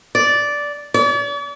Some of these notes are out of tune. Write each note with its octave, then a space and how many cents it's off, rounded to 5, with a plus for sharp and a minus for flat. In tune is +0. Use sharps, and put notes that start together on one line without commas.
D5 -10
D5 -45